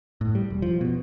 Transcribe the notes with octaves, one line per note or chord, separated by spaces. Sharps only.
A2
G3
E1
F3
B2